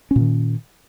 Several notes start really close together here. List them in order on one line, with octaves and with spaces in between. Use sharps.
C#4 A#2 D#3